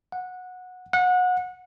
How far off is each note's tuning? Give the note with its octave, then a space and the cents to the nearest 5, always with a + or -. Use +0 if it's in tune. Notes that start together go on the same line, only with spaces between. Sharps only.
F#5 -15
F#5 -25